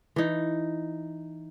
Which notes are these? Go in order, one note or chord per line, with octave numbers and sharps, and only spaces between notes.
E3 D#4